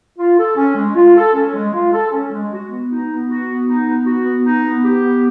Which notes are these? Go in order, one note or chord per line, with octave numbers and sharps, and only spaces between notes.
F4
A4
C#4
G#3
F4
A4
C#4
G#3
F4
A4
C#4
G#3
F#4
B3
D#4
B3
F#4
B3
D#4
B3
F#4
B3
D#4
B3
G4
B3